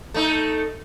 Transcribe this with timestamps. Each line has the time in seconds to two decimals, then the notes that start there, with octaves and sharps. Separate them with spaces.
0.14 A3 D#4